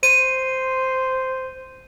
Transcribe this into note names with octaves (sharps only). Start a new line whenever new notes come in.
C5 D#7